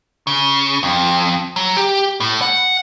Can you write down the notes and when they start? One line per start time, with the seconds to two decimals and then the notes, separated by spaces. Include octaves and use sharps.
0.27 C#3
0.83 F2
1.56 F#3
1.77 G4
2.20 A2
2.42 F#5